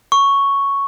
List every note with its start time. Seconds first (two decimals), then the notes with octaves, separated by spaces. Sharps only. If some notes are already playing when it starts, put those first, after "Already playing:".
0.12 C#6